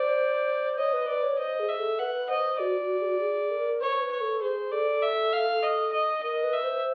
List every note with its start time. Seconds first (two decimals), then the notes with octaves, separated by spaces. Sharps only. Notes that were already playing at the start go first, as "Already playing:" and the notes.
Already playing: C5 D5
0.78 C#5 D#5
0.93 B4
1.08 B4 D5
1.23 C#5
1.39 C5 D#5
1.60 G#4
1.69 E5
1.79 A4
1.99 B4 F#5
2.30 C5 D#5
2.60 F#4 D5
2.81 F#4
3.01 G#4
3.05 F#4
3.20 G#4
3.50 A#4
3.81 C5 C#5
4.01 B4
4.11 C#5
4.21 A4
4.42 G#4 C5
4.72 A4 D5
5.02 E5
5.33 F5
5.63 D#5
5.93 D#5
6.23 A#4 D#5
6.44 B4
6.53 E5
6.64 C5